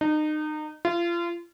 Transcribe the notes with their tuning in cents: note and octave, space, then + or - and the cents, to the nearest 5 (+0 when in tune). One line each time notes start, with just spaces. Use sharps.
D#4 -30
F4 -30